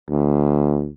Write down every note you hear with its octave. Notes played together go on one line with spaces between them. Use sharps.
D2